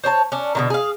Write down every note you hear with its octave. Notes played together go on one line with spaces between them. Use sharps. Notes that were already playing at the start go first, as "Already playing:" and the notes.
C5 C#5 G5 A5
C#4 D4
B2 D3 D#3
G#4 F5